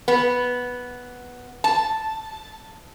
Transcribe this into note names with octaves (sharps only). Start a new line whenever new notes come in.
B3
A5